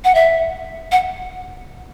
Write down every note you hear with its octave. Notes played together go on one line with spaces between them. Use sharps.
F#5
E5
F#5